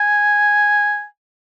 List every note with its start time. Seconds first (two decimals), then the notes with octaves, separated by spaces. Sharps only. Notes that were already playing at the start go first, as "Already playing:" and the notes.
Already playing: G#5